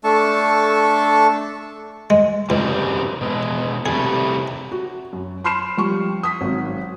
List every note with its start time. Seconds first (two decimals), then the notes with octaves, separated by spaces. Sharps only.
0.04 A3 D4 A4 A5 C#6
2.10 G#3
2.50 C#2 F#2 C3 G3
3.21 B2 G#3
3.86 C3 G3 A3 G#4
4.72 F#4
5.13 F#2
5.44 B5 C6 F6 C7 E7
5.77 F3 G3 C#6
6.23 D#6 B6
6.41 G#1 F#3